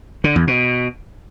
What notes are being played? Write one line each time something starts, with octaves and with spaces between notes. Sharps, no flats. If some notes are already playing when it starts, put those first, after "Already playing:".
D3
E2
B2